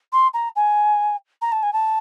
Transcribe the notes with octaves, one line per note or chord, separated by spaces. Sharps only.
C6
A#5
G#5
A#5
A5
G#5
A5